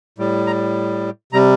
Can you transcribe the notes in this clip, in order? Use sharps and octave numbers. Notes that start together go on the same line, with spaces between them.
A2 G3
A#5
C3 G3 A#5